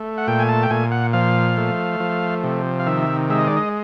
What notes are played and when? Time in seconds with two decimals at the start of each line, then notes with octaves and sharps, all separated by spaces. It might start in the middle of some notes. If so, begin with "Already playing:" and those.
Already playing: A3
0.18 F#5
0.27 A#2 G5
0.39 G#5
0.49 A5
0.63 G5
0.70 A#2 G#5
0.92 F#5
1.13 F3 F5
1.57 A3
2.00 F3
2.44 C3
2.80 F5
2.86 D#3 E5
3.30 G#3 E5
3.39 D#5
3.47 D5
3.57 D#5